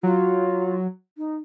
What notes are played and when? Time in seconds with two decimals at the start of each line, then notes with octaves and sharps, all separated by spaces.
0.03 F#3 F4
1.17 D#4